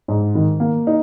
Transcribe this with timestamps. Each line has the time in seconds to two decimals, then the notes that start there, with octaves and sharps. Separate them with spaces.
0.08 G#2
0.35 D#3
0.60 A#3
0.87 D#4